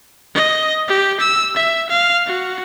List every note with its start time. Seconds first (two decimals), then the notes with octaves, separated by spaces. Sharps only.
0.35 D#5
0.88 G4
1.20 E6
1.56 E5
1.89 F5
2.26 F#4